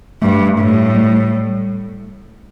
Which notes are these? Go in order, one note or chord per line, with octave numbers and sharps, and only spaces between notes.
G2 A3
A2
G3